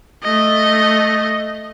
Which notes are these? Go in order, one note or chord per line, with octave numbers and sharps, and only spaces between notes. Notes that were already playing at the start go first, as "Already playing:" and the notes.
A3 D#5